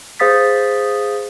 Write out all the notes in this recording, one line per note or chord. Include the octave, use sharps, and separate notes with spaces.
G#4 C5 F5 D#6 A6 B6